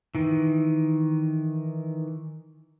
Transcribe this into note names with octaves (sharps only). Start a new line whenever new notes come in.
D#3 E3